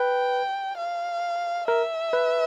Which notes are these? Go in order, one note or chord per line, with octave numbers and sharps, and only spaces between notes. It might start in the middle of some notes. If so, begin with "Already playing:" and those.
Already playing: B4 G5
F5
A#4 E5
B4